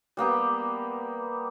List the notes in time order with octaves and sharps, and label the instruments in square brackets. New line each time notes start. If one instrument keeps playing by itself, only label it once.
[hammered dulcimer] G3 A#3 B3 G4